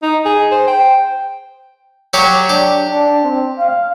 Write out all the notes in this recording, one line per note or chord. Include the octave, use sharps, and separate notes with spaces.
D#4
G#4
C5
G5
F#3 G4 C#5
D4 G4
D4
C4
F5